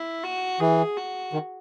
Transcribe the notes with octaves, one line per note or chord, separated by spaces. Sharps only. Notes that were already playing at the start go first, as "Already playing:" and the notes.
Already playing: E4
F#4
E3 G#4
F#4
D#3